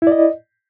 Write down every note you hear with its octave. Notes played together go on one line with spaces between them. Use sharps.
E4 D5 D#5